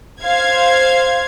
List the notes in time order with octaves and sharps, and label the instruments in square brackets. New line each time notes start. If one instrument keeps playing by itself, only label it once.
[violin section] C5 F5 G#6